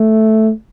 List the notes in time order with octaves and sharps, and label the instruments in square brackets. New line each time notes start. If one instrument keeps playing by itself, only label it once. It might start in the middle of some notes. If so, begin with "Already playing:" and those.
Already playing: [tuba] A3